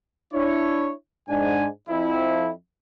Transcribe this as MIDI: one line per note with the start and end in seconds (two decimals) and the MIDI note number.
0.34 0.92 62
0.34 0.92 64
0.34 0.92 73
1.29 1.67 44
1.29 1.67 62
1.29 1.67 80
1.89 2.51 41
1.89 2.51 64